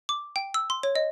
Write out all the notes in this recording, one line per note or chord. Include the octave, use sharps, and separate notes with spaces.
D6
G5
E6
C6
C#5
D#5